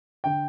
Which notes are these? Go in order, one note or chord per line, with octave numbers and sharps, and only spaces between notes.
D3 G5